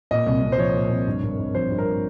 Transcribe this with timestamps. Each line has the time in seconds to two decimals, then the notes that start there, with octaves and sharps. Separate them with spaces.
0.11 A#2 D#5
0.27 C2
0.42 C2
0.52 C5
0.58 F3 C#5
0.74 A#2
0.90 C2
1.07 G2
1.23 G#1
1.39 G#1
1.55 F3 C5
1.71 G2
1.78 A#4